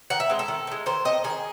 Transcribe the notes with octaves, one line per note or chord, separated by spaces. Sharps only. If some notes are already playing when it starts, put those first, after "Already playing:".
D#3 F#5
E5
G#3 C4
A4
D#3
C4
G#3
D#3 C5
A3 C4 D#5
D#3 G#4